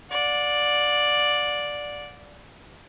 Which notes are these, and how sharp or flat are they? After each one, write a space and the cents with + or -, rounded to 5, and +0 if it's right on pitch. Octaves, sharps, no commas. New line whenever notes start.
D5 +0 F#5 -35